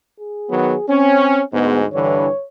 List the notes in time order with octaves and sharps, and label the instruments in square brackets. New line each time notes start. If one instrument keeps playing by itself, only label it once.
[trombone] G#4
[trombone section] D#3 F#3 B3
[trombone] C4 [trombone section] C#4
[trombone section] D2 G#2 G#3 [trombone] B3
[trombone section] G2 D3 E3 [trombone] C#5